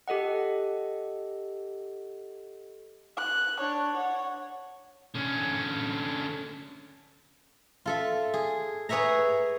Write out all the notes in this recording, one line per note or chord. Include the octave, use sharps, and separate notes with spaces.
G4 A4 D#5 F#5
F#6
D4 C#5
C#5 F#5
D3 C#4
F4 A4 E5
G#4
G#4 B4 C#5 E5 A#5